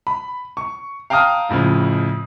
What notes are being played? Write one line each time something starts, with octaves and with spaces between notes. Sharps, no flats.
B5
C#6
F5 G5 A5 A#5 D#6 F6
F2 A2 C#3 F3